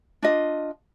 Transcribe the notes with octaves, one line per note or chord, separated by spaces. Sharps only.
D4 F4 D#5